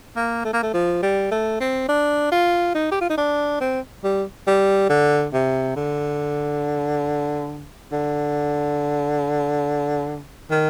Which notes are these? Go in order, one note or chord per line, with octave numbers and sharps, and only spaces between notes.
A#3
A3
A#3
A3
F3
G3
A3
C4
D4
F4
D#4
G4
F4
D#4
D4
C4
G3
G3
D3
C3
D3
D3
D#3